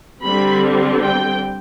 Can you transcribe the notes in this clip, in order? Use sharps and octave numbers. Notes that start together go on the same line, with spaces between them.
D3 G3 C4 B5
G5